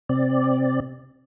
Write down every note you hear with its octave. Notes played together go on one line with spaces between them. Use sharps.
C3 C4 D5